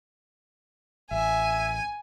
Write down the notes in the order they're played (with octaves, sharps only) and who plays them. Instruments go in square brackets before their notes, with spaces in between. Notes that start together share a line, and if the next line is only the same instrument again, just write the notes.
[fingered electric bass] A1 [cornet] E5 [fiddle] G#5